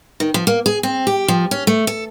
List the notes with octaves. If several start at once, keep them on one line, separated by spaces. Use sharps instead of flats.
D#3
F3
A#3
G#4
C4
G4
F3
C#4
A3
A4